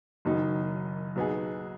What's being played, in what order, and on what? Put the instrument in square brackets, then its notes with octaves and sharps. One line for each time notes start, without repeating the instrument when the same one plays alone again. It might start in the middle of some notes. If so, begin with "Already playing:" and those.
[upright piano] F#1 F#2 D#3 F#3 D#4
B1 B2 B3 D#4 G#4